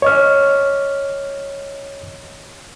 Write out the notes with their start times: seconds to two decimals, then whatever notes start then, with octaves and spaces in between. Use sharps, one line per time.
0.02 C#5 D#5 F6